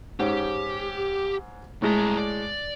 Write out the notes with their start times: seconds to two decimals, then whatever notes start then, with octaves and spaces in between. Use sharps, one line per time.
0.20 G#2 C#4 G4
1.82 C2 A2 G#3 A#5
2.18 D5